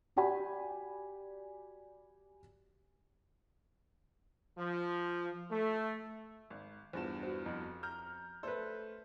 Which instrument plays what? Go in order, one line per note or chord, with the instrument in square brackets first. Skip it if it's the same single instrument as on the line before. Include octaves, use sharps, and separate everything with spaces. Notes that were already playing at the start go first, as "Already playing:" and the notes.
[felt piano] F#4 G4 D5 G#5 B5
[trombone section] F3
A3
[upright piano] G#1
[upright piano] E2 G2 E7 [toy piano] F4 G#4 C5
[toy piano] F#4 C5
[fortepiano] F2
[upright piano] A#5 F6 G6
[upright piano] A3 C5 [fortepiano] A4 B4 [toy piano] D5